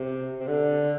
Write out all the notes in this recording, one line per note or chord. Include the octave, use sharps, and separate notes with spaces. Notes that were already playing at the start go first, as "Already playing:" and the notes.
Already playing: C3
C3
D3